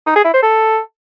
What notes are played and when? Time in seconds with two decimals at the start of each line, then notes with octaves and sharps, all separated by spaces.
0.07 D#4
0.16 G#4
0.25 E4
0.34 C5
0.43 A4